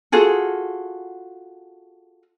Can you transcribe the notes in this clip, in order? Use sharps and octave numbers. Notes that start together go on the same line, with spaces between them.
F4 F#4 G#4 A4